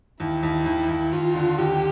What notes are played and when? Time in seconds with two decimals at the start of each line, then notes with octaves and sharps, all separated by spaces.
0.20 D#2 E4
0.43 D#2
0.66 D#2
0.89 D#2
1.12 D#2 F4
1.36 D3
1.58 D#2 G4